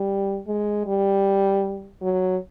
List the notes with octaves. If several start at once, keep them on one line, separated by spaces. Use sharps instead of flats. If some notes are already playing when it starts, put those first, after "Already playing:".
Already playing: G3
G#3
G3
F#3